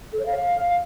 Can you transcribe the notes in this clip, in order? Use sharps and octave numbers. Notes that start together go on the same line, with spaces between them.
A4
C#5
F5